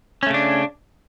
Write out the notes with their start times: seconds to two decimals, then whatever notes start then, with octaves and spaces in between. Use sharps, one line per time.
0.23 C#4
0.27 A3
0.30 C#3
0.34 D4